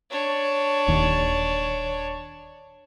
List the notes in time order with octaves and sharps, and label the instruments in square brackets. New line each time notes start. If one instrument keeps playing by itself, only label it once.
[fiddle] D4 C#5
[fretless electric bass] D#1 D#2